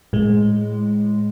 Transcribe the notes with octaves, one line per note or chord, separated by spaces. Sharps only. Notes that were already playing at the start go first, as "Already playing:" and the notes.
A2 G#3